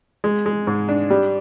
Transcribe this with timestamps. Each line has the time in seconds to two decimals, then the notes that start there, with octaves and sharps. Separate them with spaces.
0.24 G#3
0.46 G#3
0.67 G#2
0.88 D4
1.10 G3